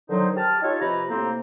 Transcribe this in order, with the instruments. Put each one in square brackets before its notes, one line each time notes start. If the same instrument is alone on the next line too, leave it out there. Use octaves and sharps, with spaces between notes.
[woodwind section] D3 D#3 F#3 D#4 C5
G4 A5 F6
D#4 F4 G4 A4 C#5
C3 F3 G4 B4 A#5
A2 C3 A#3 C4 C5 A#5